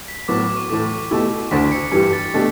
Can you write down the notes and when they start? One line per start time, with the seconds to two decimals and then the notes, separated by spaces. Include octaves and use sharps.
0.08 B6
0.28 A2 F#3 B3 D6
0.43 D6
0.56 C#6
0.70 A2 E3 A3 D6
1.11 B2 A3 E4 G4
1.51 D2 D3 A3 D4 B6
1.72 C#7
1.92 G2 E3 G3 C#7
2.13 A6
2.34 B2 A3 D4 G4